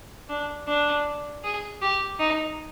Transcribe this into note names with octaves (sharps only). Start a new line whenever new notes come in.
D4
D4
G#4
G4
D#4